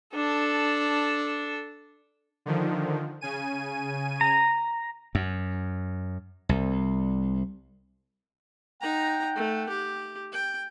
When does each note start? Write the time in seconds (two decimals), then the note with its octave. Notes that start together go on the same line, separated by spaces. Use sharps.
0.15 D4 A4
2.46 D3 D#3 F3
3.21 C#3 G#5 D#7
4.21 A#5
5.15 F#2
6.49 C2
8.81 D#4 F#5 G5 A#5
9.35 A3
9.69 G4
10.32 G5